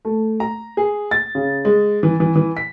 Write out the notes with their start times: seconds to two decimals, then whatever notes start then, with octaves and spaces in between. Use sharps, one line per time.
0.05 A3
0.40 A#5
0.77 G#4
1.11 A6
1.35 C#3
1.65 G#3
2.03 E3
2.20 E3
2.36 E3
2.57 B6